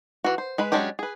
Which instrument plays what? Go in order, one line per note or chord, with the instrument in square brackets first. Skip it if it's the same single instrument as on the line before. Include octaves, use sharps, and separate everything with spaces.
[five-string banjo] E3 F#4
C5
G#3 B4 B5
F#3 G#3 C#4 D4 G4
G#4 B4